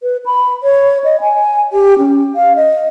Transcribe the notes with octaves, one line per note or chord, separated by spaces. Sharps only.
B4
B5
C#5
D#5
G#5
G4
C#4
F5
D#5